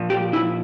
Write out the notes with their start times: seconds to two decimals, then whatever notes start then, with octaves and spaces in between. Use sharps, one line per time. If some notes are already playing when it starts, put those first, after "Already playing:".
Already playing: A#2 F3
0.10 G4
0.33 E4